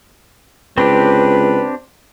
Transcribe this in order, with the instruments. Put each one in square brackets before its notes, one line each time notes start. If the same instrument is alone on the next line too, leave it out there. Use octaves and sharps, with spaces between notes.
[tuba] C#2 [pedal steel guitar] C4 D4 G4 [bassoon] B4